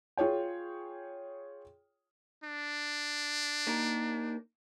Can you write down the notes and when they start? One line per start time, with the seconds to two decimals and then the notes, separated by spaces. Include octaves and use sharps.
0.17 F4 G#4 C#5 G5
2.44 D4
3.67 A#3 D#4 A#4